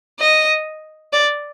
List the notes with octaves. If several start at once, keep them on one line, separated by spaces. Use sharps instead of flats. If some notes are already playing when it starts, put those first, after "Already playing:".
D#5
D5